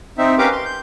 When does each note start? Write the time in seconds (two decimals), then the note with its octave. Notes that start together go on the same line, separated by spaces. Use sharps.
0.18 C4 D#4 E5
0.38 C#4 G4 A#4 B4 F5 D6
0.52 C6
0.65 G6